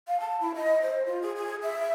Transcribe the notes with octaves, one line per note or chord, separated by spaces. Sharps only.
F5
A5
E4
D#5
C5
F4
G#4
G#4
E5